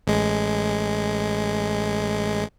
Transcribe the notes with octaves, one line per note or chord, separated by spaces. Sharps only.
A1 G#3